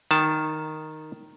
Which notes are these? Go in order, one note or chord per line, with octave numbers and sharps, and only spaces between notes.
D#3 A5